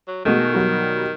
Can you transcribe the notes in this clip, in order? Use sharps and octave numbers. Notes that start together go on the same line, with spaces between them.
F#3
B2 D#3 G#3 A3
B2 F#3 G3